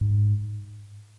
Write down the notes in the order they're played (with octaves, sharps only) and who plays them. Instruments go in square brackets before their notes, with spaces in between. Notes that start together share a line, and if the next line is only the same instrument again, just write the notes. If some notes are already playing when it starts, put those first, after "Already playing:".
[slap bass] G#2